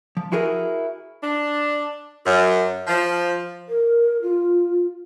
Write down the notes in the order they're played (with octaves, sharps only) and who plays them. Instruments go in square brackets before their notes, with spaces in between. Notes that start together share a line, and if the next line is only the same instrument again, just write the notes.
[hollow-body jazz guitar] F3
E4 F#4 G#4 A#4 C5 D#5
[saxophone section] D4
F#2
F3
[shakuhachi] A#4
F4